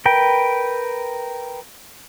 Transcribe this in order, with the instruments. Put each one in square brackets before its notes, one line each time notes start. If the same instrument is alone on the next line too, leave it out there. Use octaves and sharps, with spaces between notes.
[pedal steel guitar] A#4 B4 G5